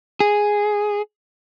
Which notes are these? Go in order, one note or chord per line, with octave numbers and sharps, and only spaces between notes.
G#4